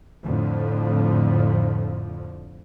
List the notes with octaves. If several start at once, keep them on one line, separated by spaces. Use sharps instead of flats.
F2 A2 D3 F3